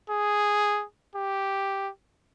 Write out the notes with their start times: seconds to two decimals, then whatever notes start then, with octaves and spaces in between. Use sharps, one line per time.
0.10 G#4
1.16 G4